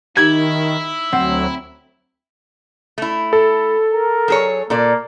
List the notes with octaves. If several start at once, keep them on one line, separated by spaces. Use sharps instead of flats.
D#3 D#4 E4 G4 G#6
D2 F#3 C4 F#5
A3 E4
A4
A#4
F#3 G#4 C#5
A#2 A#3 A4 D5